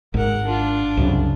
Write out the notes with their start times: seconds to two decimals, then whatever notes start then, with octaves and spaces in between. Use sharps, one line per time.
0.14 G#1 G#2 A#4 F#5
0.45 D4 F4
0.97 C2 F#2 C#3